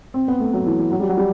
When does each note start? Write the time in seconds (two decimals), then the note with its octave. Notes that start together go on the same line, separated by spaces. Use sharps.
0.14 C4
0.28 B3
0.40 A3
0.53 F#3
0.66 E3
0.79 E3
0.91 F#3
1.00 G3
1.09 F#3
1.18 G3